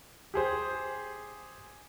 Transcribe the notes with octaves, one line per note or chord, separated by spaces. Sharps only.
G4 G#4 C5